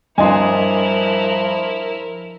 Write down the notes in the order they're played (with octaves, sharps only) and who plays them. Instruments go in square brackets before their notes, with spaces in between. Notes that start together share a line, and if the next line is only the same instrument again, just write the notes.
[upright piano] G2 C6 [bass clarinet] F3 [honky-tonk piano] D4 D#5 G#5 [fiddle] E4 A#4